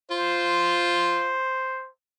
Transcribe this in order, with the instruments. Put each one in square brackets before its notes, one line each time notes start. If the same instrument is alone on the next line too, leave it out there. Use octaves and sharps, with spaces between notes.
[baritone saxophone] F4 [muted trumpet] C5